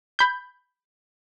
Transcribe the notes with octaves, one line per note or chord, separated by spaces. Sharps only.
B5 G6